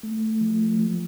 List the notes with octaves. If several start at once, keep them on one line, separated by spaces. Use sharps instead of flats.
A3
F3
F3